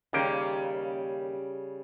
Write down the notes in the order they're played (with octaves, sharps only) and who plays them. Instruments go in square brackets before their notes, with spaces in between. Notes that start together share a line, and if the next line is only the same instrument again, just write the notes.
[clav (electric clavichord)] D#2 A#3 G5 [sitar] C#3 G3